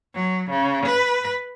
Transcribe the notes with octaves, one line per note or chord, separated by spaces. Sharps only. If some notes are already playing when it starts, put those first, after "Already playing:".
F#3
C#3
B4